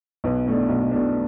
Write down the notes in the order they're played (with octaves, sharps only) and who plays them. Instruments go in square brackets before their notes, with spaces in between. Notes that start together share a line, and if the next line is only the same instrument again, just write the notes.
[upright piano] B1 B4
B2 A3 D4
B1
B2 A3 D4